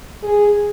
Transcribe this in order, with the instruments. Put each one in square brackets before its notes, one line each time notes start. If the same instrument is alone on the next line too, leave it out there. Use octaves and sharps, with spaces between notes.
[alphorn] G#4